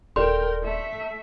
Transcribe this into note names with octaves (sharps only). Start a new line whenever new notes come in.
D#1 A4 A#4 D5 G5 C6
A3 E5